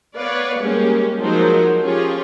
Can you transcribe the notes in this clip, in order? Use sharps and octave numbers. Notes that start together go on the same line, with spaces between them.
B3 B4 C#5 D5 F5
G3 G#3 A#3 C#4 G4
F3 F#3 G#3 D#4 A#4 C5
F3 C#4 F4 G4 G#4 C#5